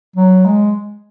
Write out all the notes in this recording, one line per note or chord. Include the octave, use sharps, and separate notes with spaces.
F#3
G#3